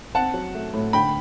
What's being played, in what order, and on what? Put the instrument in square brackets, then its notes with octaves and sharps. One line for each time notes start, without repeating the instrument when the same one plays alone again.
[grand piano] C4 F#5 A5
F#3
A3
A2
D2 G5 B5